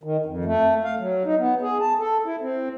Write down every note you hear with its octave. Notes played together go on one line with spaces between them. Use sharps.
D#3
F2
A3
F5
F#3
D#4
B3
G#4
A5
A4
E4
C4